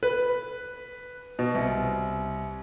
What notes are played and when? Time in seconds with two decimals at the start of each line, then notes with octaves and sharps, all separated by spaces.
0.03 B4
1.39 B2
1.55 C2